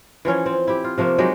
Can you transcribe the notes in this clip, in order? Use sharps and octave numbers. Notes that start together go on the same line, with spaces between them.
E3 F3 C#4 C#5
C4
E4 G4
F4
C3 F3 A3 A#3
F#3 G#3 D#4 G4